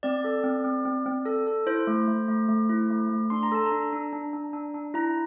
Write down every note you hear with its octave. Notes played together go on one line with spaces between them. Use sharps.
C4 D5
A4
C4
C4
C4
C4
A4
A4
E4 C5
A3
A3
A3
A3
E4
A3
A3
D4 C6
A#5
A4 A5
A#5
D4
D4
D4
D4
D4
D4
E4 A#5